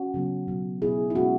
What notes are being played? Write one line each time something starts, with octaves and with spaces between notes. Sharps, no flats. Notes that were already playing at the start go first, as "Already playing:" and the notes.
Already playing: C#4 F#4
C#3 F#3 B3
B2 F#3 B3
B2 B3 E4 G#4
E4
B2 G#3 B3 C#4 F#4